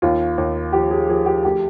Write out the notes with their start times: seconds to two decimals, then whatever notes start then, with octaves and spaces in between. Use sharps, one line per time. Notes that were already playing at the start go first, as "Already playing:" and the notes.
0.02 D#2 F4
0.38 D#2
0.73 F3 G4
0.91 G#4
1.08 F3 G#4
1.26 G4
1.43 D2 G4